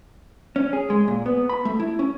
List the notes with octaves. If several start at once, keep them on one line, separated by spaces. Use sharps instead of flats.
C#4
G#4
G#3
A#2
B3
B5
A3
E4
C#4